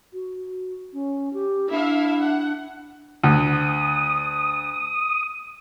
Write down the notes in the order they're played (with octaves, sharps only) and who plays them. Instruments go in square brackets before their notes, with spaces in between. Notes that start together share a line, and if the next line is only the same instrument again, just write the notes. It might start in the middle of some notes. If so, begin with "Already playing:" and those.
[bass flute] F#4
C#4
G4
[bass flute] D4 [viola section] E4 E5 F5
[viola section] F#5
[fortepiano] D2 [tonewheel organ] D#6